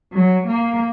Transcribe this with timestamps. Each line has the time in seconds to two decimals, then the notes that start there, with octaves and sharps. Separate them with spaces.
0.13 F#3
0.48 A#3